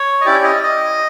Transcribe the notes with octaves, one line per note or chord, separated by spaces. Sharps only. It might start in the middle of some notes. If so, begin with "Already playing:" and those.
Already playing: C#5
D#5
C#4 E4 G4 D5
D#5
D#5